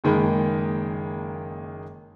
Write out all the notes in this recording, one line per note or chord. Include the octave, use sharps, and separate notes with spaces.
F#1 D#3 G#3 A#3 B5